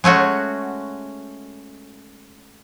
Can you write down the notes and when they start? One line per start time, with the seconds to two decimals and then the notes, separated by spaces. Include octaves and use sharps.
0.04 G#3 A3 C#4 F#4